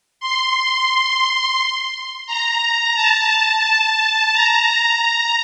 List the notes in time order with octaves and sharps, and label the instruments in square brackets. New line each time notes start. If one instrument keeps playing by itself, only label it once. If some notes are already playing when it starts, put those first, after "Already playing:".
[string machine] C6
A#5
A5
A#5